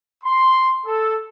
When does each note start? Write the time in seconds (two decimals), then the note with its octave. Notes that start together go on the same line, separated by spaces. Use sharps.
0.24 C6
0.87 A4